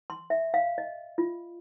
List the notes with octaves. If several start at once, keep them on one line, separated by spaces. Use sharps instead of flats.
C6
E5
F5
D#5
F4